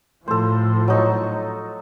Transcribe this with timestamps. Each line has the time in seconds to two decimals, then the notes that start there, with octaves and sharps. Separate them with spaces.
0.28 A2 F3 A4 C5
0.88 F#3 D#4 C#6